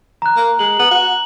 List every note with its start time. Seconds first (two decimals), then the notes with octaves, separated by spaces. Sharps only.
0.22 A#5 F#6
0.36 A#3
0.59 G#3 F#7
0.79 B3 F#7
0.91 F#4